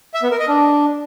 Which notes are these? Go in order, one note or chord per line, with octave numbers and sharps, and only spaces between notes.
E5
B3
A#4
D#5
D4